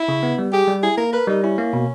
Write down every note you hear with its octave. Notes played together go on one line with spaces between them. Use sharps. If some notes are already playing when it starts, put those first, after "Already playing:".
Already playing: E4
C#3
B3
G3
G4 G#4
G3
E4 G#4
A#3 A#4
A#4 B4
G3 D#4
C#4 E4
A#3
B2